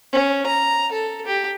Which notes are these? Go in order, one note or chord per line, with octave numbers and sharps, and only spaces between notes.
C#4
A#5
A4
G4